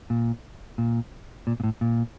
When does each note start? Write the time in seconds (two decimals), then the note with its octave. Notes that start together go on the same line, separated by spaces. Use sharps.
0.10 A#2
0.78 A#2
1.47 A#2
1.60 A#2
1.64 A2
1.81 A#2